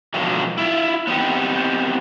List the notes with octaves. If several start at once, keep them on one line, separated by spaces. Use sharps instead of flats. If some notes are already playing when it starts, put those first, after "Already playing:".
G#2 B2 D3 F3 F#3
E4 F4
B3 C4 D#4 G4